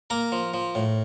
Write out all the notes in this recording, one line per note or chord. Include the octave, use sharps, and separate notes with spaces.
A#3 A#4 A#5
F3
F3
A2